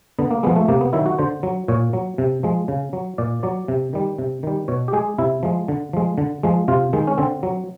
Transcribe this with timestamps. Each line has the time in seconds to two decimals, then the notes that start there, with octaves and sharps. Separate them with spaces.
0.19 D3 B3
0.31 A#3
0.43 F3 G#3 B3
0.56 A3
0.68 C3 A#3
0.81 B3
0.93 D#3 F#3 E4
1.06 F#4
1.18 D3 C5
1.43 F#3
1.68 A#2 C#5
1.93 F#3
2.18 C3
2.43 F3 G#3
2.68 C#3
2.93 F#3
3.18 A#2 D5
3.43 F#3 D5
3.68 C3
3.93 D#3 G3
4.18 C3
4.43 D#3 G3
4.68 B2 C#5
4.88 G4
4.93 G#3 G#4
5.18 C3 E4
5.43 F3 G#3
5.68 D3
5.93 F3 G#3
6.18 D3
6.43 F3 G#3
6.68 C3 F4
6.93 D#3 G#3
7.07 C#4
7.18 D3 C4
7.43 F#3